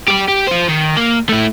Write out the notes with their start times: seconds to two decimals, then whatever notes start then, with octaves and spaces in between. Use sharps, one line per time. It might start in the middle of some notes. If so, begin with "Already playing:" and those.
0.08 G4 D5
0.28 G4
0.48 F4 C5
0.68 D#3
0.97 A#3
1.29 A3 E4